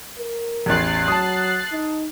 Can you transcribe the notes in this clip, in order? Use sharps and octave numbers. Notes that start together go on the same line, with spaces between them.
A#4
A1 E2 F#6 A6 C7
F#3 A5 D#6
D#4